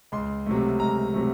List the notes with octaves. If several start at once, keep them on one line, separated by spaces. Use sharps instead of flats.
C#2 C6
C3 F#3 A3
C#2 A#5
C3 F#3 A3